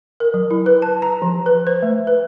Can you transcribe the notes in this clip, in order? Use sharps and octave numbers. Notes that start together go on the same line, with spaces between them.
A#4
F#3
E4
B4
A5
A#5
F3
B4
C5
A3
B4